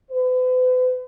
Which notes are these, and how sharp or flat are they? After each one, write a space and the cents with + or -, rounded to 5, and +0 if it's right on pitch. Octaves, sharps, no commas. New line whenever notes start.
B4 +45